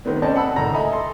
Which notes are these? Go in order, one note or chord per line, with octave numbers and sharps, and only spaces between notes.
C3 D#3 A3 B3 C4
C4 C#4 D5 D#5 A5
F#5 A5 B5 E6
C#2 A2 D#3 A#5 A#6
D#5 E5 G#5 A#5 B5
A4 C6